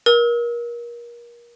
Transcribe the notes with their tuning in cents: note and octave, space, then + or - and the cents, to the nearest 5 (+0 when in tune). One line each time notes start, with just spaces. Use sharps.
A#4 +30 E6 -35